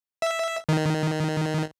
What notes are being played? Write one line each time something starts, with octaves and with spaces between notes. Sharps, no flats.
E5
D#3